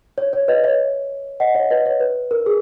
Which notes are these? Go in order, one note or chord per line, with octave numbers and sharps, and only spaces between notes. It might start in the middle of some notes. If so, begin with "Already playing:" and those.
C#5
C#5
B4 D#5
C#5 E5
D#5 F#5
C#5 E5
B4 D#5
C#5
B4
A#4
G#4